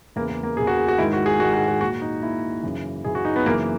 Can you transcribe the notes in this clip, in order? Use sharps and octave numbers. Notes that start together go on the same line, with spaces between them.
E2 C#3 E3 A#3
A#3
A#3
E2 C#3 E3 G#4
F#4
G#4
F#4
G#2 D#3 E4
F#4
G#4
G#2 D#3 F#4
F#4
F#4
A#2 F#4
D#4
A#2 E4
F#2 C#3 E3
F#2 C#3 E3 G#4
F#4
D#4
B3
F#2 C#3 E3 A#3